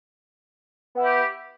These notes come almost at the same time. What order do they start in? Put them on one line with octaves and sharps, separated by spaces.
B3 E4 G4